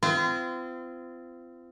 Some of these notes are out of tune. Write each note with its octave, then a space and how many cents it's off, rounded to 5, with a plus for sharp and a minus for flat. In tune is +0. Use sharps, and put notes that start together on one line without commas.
C4 -35 F4 -30